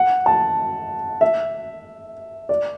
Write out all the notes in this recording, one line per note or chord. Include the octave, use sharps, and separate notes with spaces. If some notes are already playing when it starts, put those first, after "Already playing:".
Already playing: F#5
A5
E5
D5